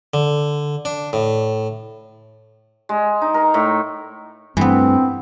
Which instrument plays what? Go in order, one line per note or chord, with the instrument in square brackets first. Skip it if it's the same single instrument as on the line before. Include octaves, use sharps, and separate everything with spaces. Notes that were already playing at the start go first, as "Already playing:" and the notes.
[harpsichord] D3
D4
A2
[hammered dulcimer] G#3
D#4
A#4
A2
[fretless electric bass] G2 A3 [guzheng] E3 B3 [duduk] C4